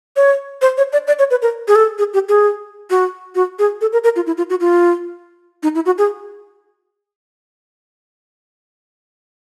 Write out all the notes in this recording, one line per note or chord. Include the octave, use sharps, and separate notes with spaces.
C#5
C5
C#5
D5
D5
C#5
B4
A#4
G#4
A4
G#4
G4
G#4
F#4
F#4
G#4
A4
A#4
A#4
F4
E4
F4
F#4
F4
D#4
E4
F#4
G#4